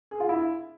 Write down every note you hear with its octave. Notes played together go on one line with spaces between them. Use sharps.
G#4
F4
E4